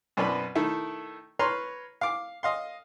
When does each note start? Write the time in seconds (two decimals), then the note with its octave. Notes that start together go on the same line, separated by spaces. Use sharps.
0.17 F#2 B2 C4 D4 B4 B5
0.55 D#3 A3 E4
1.39 B4 C#5 A#5 C6 F6
2.01 F5 D6
2.43 D#5 F5 C6